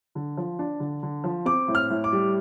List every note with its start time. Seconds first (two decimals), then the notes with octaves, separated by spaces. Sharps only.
0.15 D3
0.37 F3
0.59 D4
0.80 D3
1.03 D3
1.24 F3
1.45 C4 D6
1.68 A2
1.75 F6
1.90 A2
2.04 D6
2.12 G3